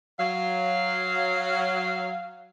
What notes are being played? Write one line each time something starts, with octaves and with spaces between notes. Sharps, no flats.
F#3 F5